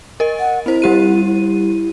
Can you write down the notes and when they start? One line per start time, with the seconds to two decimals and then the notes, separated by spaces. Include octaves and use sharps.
0.20 A#4 D#5
0.39 F#5
0.66 C4 E4 C5
0.82 G3 G4 D#7
1.25 E4